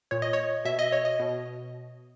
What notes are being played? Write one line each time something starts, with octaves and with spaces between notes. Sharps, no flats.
A#2 C#5
D#5
C#5
B2 E5
D#5
C#5
D#5
B2